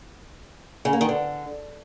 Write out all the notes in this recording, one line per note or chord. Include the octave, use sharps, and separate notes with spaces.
C#3
A#3
D#3
D3